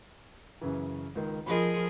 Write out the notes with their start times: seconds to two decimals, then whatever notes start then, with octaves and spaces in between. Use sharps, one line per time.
0.61 F#2 C#3 E3
1.15 C#2 D#3
1.46 F3 G#4 A#4 D#5 B5